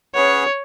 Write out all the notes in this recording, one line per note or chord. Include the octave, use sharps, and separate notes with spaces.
C#4 G#4 B4 C#5 F#5